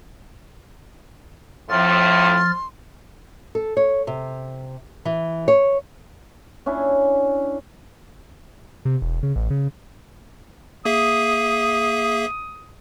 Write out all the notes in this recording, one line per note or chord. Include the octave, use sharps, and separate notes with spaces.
F2 A2 F3 C6 F6 A6
A4
C#5
C3
E3
C#5
C#4 D4 E4
C3
E1
C#3
A1
C#3
A#3 G#4 E5 D#6